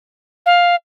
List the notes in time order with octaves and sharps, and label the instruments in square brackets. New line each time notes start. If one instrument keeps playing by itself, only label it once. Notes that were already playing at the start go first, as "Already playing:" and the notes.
[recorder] F5